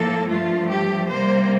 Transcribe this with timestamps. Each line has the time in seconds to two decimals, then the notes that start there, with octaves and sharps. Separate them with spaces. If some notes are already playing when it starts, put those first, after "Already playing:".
Already playing: A2 F3 A#3 A4
0.29 G2 F3 A3 F4
0.70 G4
1.10 C3 G3 A#3 C5